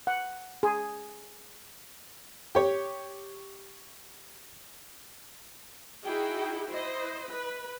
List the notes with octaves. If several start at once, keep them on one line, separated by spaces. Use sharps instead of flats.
F#5
G#4
G4 C#5
D#4 E4 F#4 G#4 G5
E4 C5 D#5
B4